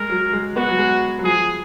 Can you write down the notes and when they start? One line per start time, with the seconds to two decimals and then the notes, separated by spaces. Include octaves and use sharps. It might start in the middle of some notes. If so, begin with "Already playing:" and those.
Already playing: G#3 A#4
0.10 F#3
0.33 G#3
0.56 B3 F#4
0.68 F#3
0.78 G#3
1.19 F#3
1.24 F3 G#4